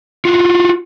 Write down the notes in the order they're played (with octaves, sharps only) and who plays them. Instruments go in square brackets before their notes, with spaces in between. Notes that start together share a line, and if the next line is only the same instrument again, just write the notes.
[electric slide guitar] F4 F#4